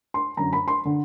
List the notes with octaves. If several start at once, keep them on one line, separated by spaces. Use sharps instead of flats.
C6
F#2 D3 A#5
B5
C6
D3